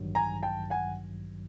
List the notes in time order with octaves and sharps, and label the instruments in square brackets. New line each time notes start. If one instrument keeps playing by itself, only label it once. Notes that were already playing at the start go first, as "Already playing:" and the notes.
Already playing: [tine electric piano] A1 G2 D#3 F#3
[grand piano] G#5 A#5
G5 A5
F#5 G#5